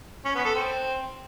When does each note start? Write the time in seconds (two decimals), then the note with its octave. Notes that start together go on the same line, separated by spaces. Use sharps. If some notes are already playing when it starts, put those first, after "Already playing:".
0.25 C#4
0.35 B3
0.45 A4
0.54 C4